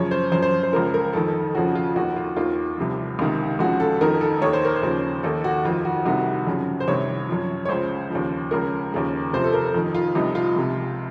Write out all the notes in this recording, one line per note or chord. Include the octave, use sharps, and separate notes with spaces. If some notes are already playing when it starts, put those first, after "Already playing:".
Already playing: F#2 C#3 F3 C#5
C5
F#2 F3 C5
C5
C5
C#2 C#3 F3 A#4
A#4
F2 D#3 A4
F2 C#3 F3 F#4
F4
D#2 D#3 F#4
F4
D#2 D#3 F4
C2 C3 F3
C#2 C3 D#3
C#2 C#3 F3 F#4
A4
F2 D#3 A#4
A4
D#2 D#3 C#5
C5
A#4
C5
D#2 C#3 F3
D#2 D#3 A4
F#4
F2 D#3 F4
F#4
C2 C3 D#3 F#4
F#2 C#3 F3
C5
C2 C3 D#3 C#5
F#2 F3
C#5
C#2 C#3 F3 C5
D#2 C#3 F3
C#2 C#3 F3 A#4
D#2 C#3 F3
F2 C3 F3 C5
A4
A#4
F2 D#3
F4
C2 C3 F3 D#4
F4
C#2 C3 F3